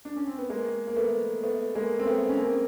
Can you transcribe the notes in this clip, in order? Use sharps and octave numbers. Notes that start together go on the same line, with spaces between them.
D4
C#4
C4
B3
G#3 A#3
A#3
A3 B3
A3 B3
G#3 A#3
C4
A3 B3
C#4
A#3 C4